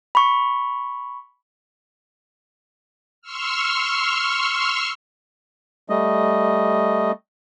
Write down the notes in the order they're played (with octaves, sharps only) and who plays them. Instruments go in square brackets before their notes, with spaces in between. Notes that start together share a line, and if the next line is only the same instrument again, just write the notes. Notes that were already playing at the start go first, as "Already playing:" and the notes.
[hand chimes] B5 C#6
[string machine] C6 C#6 E6 F6
[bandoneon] G3 A3 D#5